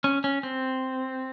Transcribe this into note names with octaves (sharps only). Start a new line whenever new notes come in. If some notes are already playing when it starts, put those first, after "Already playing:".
C#4
C#4
C4